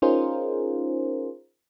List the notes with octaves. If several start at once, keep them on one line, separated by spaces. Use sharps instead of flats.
C#4 D#4 F4 G#4 A#4 C5